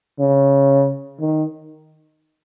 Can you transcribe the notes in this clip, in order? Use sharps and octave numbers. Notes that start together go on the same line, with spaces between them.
C#3
D#3